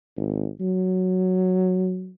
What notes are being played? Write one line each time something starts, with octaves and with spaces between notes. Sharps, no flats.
G#1
F#3